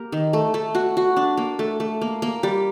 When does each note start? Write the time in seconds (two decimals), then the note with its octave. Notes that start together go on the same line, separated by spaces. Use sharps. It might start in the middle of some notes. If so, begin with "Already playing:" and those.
Already playing: A#3 G4 A#4
0.12 D#3
0.33 A3
0.54 A3
0.75 F#4
0.97 F#4
1.17 D4
1.37 A#3
1.59 A3
1.80 A3
2.02 A#3
2.22 A#3
2.43 G3